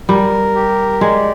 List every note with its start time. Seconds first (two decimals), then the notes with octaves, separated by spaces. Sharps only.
0.08 G3 A#4
0.55 G4
1.01 G#3 D5